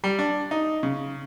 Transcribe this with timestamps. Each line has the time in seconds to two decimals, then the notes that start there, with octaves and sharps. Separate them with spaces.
0.04 G3
0.19 D4
0.51 D#4
0.83 C#3